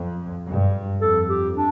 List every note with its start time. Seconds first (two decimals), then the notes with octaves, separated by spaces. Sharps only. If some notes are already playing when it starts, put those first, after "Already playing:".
Already playing: F2
0.47 G2
1.01 F2 A4
1.29 G4
1.56 D4